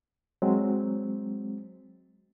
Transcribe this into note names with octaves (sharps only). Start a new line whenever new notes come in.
F#3 G#3 C4